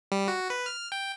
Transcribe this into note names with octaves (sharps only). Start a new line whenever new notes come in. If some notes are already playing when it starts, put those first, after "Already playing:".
G3
F#4
B4
F6
G5